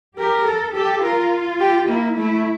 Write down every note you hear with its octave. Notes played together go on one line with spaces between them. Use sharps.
G4 A#4
A4
G4 A4
F4 A#4
G4
A#3 E4
A3 E4